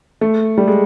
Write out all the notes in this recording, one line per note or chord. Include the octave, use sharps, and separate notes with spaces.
A3
G3
G#3